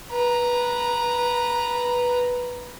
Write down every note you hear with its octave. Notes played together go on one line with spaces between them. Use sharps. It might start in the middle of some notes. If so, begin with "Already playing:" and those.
B4 A#5